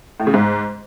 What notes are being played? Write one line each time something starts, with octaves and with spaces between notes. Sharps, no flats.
A2
C#3
G#2